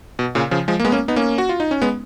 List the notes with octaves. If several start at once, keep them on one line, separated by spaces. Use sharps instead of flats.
B2
A#2 C#3
C#3 F3
F3 G#3
A#3
G#3 B3
A#3 C#4
B3 D#4
A#3 C#4
F#4
F4
D#4
C#4
G#3 B3